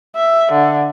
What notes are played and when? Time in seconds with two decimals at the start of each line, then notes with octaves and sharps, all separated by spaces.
0.16 E5
0.52 D3